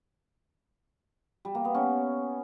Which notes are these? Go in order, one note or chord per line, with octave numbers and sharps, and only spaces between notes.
G3
A#3
B3
C#4